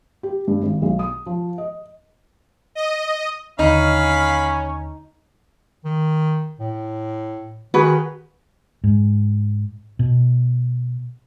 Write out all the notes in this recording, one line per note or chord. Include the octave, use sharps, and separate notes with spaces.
G4
G2
G#1
B1
D#6
F3
D#5
D#5
D#2 D3 C#4 D#4 F5 B5
D#3
A2
D#3 F#4 G#4 B4
G#2
B2